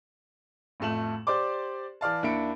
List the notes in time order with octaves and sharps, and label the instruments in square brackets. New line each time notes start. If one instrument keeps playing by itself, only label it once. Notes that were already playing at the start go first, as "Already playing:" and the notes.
[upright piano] A1 F2 A3 E7 F#7
G4 C5 D5 C6 D6
E3 D5 F5 A5
D#2 D4 E4 B5 C#7 D7